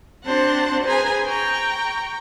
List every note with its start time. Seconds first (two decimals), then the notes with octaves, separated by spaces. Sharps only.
0.24 C4 D4 F#4 C5 F#5 A5
0.84 G#4 B4 C5 G#5 A#5
1.26 G5 A#5 C#6